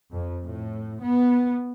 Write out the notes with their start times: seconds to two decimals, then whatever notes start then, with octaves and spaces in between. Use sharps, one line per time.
0.12 F2
0.44 A2
1.03 B3